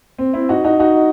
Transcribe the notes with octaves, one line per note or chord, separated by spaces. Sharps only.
C4
C4 E4
D#4 F#4
D#4 F#4
D#4 F#4